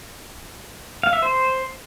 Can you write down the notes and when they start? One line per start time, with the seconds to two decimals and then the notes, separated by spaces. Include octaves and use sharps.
1.03 F5
1.13 E5
1.22 C5